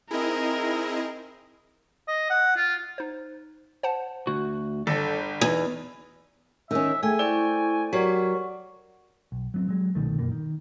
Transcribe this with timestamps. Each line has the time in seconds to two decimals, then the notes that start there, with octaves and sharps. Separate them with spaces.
0.11 C4 D#4 E4 G#4 A#4 D#5
2.08 D#5
2.30 F#5
2.57 F4
2.98 D#4 C5
3.83 C5 F#5 A5
4.27 D2 F#4
4.87 G1 A4 A#6
5.41 E2 D#4 G#5
6.71 D#3 C#4 E5
7.03 A3 G#4 G5 G#5 E6
7.19 E4 C5 D5 G5 C#6
7.93 F#3 F#4 G4 A#4 D5 F#5 C#6
9.32 B1
9.54 F#3 B3 C4
9.68 F#3 G#3
9.95 C2 B2 D#3 A3
10.19 F#2 B2 A#3
10.32 D#3